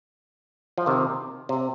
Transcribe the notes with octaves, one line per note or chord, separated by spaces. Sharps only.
F3
C3 D#3
C3